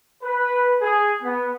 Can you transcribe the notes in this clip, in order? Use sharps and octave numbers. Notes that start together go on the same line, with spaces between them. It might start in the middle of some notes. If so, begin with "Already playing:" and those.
B4
G#4
B3